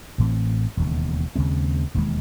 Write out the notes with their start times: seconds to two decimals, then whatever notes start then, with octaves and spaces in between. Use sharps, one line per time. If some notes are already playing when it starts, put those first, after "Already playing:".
0.18 A1 A2 E3 C4
0.77 E1 D#2 C#3
1.36 D#2 C#3 G#3 C4
1.94 E1 D#2 D#3 G#3